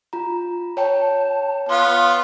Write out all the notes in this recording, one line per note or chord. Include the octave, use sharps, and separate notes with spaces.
F4 A#5
C#5 G5 A5
B3 F4 C6